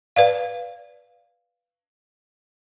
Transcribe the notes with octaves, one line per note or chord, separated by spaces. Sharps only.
B4 D5 F5